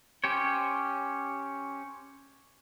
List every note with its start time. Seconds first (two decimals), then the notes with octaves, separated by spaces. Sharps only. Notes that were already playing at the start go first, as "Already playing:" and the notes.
0.24 C#4 G4 C5 C#5